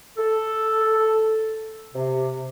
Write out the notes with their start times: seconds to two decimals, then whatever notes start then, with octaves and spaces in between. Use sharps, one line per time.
0.18 A4
1.94 C3